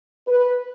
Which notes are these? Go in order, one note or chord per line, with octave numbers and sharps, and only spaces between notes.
B4